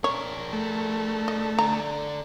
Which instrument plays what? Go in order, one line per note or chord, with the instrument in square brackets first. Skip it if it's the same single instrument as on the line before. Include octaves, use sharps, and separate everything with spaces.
[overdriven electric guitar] D4 A#4 [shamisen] C#5
[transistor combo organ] A3
[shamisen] D#5
[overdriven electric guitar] D3 D4 [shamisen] A#5